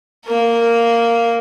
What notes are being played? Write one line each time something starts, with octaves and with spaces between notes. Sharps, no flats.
A#3 A#4